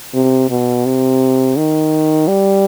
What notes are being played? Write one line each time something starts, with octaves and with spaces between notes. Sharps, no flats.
C3
B2
C3
D#3
G3